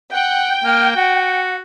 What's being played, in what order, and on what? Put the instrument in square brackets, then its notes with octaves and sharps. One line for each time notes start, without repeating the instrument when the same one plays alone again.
[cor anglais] F#5 [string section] G5
[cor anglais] A#3 [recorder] F6
[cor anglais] F#4 [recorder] F#5